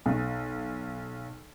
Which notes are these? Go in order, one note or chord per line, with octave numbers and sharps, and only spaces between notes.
B1